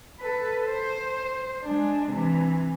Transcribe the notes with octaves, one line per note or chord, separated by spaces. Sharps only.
A4 B4
C5
G#3 D4
C3 E3